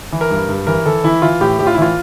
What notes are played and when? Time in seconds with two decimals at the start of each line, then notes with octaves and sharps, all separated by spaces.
0.12 E3
0.21 A#4
0.31 G2
0.49 G2
0.67 E3 A#4
0.86 E3 A4
1.04 E3 E4
1.22 E3 F4
1.41 A2 G4
1.59 A2 G4
1.67 F4
1.74 E4
1.78 E3 F4